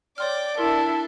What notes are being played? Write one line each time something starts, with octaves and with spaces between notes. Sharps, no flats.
C#5 D5 G5 C6 D6 F6
D4 E4 A4 A#4 C6